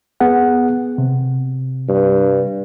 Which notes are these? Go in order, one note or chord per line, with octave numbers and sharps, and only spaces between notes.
B3 G#4 F#5
C3
G2